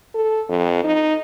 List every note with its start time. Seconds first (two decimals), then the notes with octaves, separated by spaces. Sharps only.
0.15 A4
0.49 F2
0.84 D#4